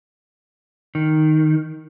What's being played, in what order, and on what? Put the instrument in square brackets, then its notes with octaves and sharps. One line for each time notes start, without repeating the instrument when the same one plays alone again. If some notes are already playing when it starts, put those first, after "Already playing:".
[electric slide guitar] D#3